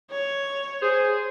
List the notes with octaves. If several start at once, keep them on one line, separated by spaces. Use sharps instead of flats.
C#5
G#4 C5